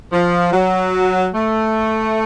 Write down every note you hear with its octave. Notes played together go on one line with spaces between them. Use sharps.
F3
F#3
A3